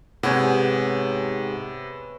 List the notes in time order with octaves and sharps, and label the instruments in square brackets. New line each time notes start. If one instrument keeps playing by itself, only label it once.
[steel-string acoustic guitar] G#2 G4 G#4 [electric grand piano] C3 [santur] B3 C#5 G#5